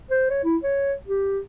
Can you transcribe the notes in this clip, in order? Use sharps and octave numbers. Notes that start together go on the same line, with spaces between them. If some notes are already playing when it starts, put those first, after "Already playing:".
C5
C#5
E4
C#5
G4